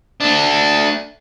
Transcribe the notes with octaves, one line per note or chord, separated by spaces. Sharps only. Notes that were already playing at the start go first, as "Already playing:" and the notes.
A3 D4